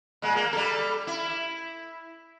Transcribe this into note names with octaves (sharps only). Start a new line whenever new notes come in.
A#2 G#3
A#3
G3 A4
E4